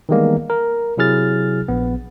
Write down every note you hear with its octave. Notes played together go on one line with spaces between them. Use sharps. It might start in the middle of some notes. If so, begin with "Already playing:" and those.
D#3 E3 G3 G#3 A#3 B3
A#4
C3 F#3 E4 G#4 F6 A6
A#1 B3